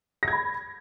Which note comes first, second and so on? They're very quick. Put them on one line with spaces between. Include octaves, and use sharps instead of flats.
A#6 G#6 B5